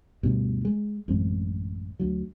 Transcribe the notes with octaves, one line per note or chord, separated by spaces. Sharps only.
D2 G2 B2
G#3
A1 F#2 G#3 C4
D2 F#3